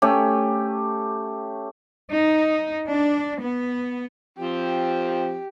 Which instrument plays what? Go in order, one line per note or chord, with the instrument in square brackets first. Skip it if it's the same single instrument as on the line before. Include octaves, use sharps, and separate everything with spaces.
[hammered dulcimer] A3 C#4 G4
[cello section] D#4
D4
B3
[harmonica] F3 C4 [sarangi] G4